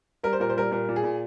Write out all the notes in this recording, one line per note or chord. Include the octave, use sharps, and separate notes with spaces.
G3 A#4
C5
A#2 A#4
C5
G3 A#4
A#2 A#4
A#2
G#4
A#2